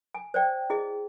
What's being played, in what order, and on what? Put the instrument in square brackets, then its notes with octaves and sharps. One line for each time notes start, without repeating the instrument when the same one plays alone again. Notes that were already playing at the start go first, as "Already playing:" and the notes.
[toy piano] G#5
C5 D5 G5
E4 G#4 D#5